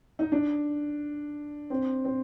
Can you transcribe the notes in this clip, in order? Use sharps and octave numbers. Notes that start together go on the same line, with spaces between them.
D#4
D4
C4
C4